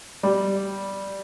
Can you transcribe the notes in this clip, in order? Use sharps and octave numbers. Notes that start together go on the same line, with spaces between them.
G3